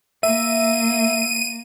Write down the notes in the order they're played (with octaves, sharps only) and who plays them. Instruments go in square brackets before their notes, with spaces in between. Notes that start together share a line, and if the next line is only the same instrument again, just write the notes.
[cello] A#3 [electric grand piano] E5 [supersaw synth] D#7